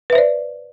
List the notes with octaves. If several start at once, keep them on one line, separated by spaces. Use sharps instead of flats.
B4 C5 D5 E5